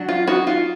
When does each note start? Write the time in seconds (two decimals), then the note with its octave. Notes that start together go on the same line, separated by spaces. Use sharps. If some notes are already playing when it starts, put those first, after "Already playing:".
Already playing: F#3 D4
0.09 F4
0.27 D#4 F#4
0.47 F4